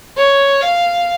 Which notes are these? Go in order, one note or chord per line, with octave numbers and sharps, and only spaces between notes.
C#5
F5